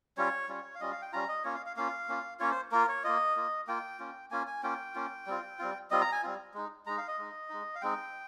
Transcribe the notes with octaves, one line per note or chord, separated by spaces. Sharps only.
G3 C#4 F4 C#5
G3 C#4 F4
F5
G3 C#4 F4 D#5
F5
G5
G3 C#4 F4 A#5
D#5
A#3 C#4 F4 C#5
F5
F5
A#3 C#4 F4 F5
A#3 C#4 F4
A#3 C#4 F4 C#5
C5
A#3 F4 A#4
C#5
A#3 F4 D#5
A#3 F4
A#3 F4 G5
A#3 C#4 F4
A#3 C#4 F4 G#5
G#5
A#3 C#4 F4 G5
A#3 C#4 F4
G3 C4 F4
G3 C4 F4
G3 C4 F4 D#5
A#5
G#5
G3 C4 F4
G#3 D#4
G#3 D#4 A#5
F5
D#5
G#3 D#4
G#3 D#4
F5
G#3 C4 D#4 G5